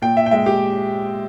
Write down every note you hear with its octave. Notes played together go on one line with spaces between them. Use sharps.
A#2 G5
E5
G5
G#3 E5
G4